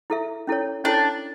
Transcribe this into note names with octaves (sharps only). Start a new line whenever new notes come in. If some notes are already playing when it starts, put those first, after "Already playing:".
E4 A4 E5
C#4 E4 A4 C#5
C#4 D4 E4 A4 C#5